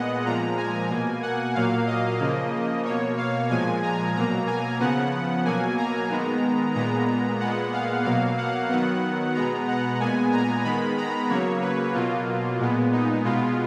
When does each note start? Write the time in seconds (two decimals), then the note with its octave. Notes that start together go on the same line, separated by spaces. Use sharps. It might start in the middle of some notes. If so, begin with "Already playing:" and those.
Already playing: A#2 G#3 B3 D#5 F#5
0.25 A#2 F3 G#3 A#5
0.57 G#5
0.90 B2 A#3
1.22 F#5
1.55 A#2 F#3 A#3 F5
1.87 D#5
2.20 C#3 F3 A#3
2.85 B2 A#3 C#5
3.18 F5
3.50 A#2 F3 G#3 G#5
3.83 A#5
4.16 B2 F#3 A#3 A#5
4.47 G#5
4.80 C#3 F3 B3 F#5
5.45 B2 F#3 A#3 G#5
5.78 A#5
6.10 D#3 G#3 B3
6.75 A#2 G#3 B3 A#5
7.39 A#2 G#3 B3 F#5
7.73 F5
8.05 B2 F#3 A#3 F5
8.38 F#5
8.69 D#3 F#3 B3 F#5
9.35 B2 G#3 B3 A#5
9.68 F#5
10.00 A#2 G#3 B3 G#5
10.32 A#5
10.64 D#3 G#3 B3 B5
10.97 A#5
11.30 C#3 F#3 A#3 C#5
11.62 B4
11.94 B2 F#3 A#3 F4
12.59 A#2 G#3 B3
12.93 D#4
13.25 B2 G#3 B3 F4